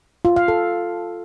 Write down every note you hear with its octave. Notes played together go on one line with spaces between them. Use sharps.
F4
F5
A4